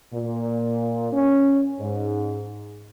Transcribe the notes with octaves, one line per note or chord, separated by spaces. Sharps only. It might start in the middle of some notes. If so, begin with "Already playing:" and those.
A#2
C#4
G#2